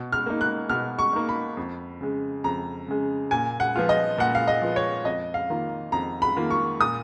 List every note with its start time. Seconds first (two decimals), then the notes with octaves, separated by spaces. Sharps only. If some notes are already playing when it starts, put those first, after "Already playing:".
Already playing: B2
0.12 F6
0.26 A#3 D#4
0.41 F#6
0.69 B2 F6
0.99 C#6
1.13 A#3 D#4
1.29 B5
1.57 F2
2.01 C#3 G#3
2.44 F2 A#5
2.88 C#3 G#3
3.31 A#2 G#5
3.60 F#5
3.76 F3 B3 F4
3.89 D#5
4.18 A#2 F#5
4.35 F5
4.48 D#5
4.62 F3 B3 F4
4.76 C#5
5.05 F2 D#5
5.34 F5
5.50 D#3 A#3 F4
5.92 F2 A#5
6.22 B5
6.37 D#3 A#3 F4
6.50 C#6
6.80 A#2 D#6